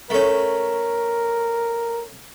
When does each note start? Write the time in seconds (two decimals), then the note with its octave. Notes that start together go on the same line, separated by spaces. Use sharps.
0.10 A3 C#4 A#4